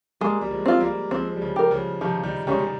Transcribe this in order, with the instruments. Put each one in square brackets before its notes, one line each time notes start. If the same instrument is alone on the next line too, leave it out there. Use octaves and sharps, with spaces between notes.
[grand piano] G3 A#3 [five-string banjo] G#3
[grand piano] G3
F3 G#3
[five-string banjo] C4 F4
[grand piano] G3 A#3
[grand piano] F3 G#3 [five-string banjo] C4
[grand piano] G3
C#3 F3
[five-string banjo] G4 A#4
[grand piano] C#3 F3
[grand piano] C3 D#3 [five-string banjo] F3
[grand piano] D#3 G3
[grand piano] D#3 G3 [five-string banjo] G#3 C#4 G4
[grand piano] G3